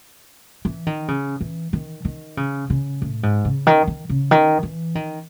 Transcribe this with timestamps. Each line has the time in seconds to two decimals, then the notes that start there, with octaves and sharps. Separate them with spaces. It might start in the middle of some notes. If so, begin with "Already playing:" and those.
0.65 E3
0.87 D#3
1.08 C#3
1.41 E3
1.73 D#3
2.05 D#3
2.37 C#3
2.70 C#3
3.02 A2
3.23 G#2
3.45 C#3
3.67 D#3
3.87 D#3
4.10 C#3
4.31 D#3
4.63 E3
4.95 D#3